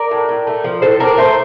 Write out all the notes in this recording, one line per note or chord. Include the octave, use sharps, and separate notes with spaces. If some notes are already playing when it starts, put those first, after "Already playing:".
Already playing: A#4 D5
A2
A2
A3
F3
A2 A4 C5
A2 A#4 D5
A3 C5 E5